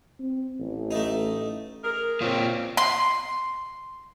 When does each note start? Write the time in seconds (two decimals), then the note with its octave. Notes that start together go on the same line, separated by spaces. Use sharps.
0.19 C4
0.59 A1
0.91 A3 D#4
1.84 G#4 A#4
2.21 A#2 C4 C#4 F4
2.77 C6